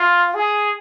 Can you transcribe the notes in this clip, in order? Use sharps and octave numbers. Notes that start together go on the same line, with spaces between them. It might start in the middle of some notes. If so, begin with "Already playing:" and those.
Already playing: F4
G#4